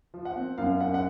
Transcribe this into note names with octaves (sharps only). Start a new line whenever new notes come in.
F3
F#5
C4
F#2 F5
F#2 F#5
F#5